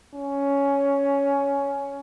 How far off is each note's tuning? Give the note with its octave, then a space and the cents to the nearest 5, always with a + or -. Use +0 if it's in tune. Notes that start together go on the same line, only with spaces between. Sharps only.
C#4 +10